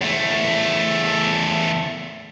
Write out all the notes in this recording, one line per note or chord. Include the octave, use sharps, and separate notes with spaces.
E2 A3